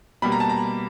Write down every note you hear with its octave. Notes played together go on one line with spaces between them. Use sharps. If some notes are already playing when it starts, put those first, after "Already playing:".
B2 G3 A#3 B5
A#5
A5
A#5